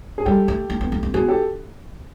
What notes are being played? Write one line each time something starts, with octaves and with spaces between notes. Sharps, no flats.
G#4
G3 G4 A4
A3
A#3
B3
B3
C4
B3 F#4 G#4
G4 A4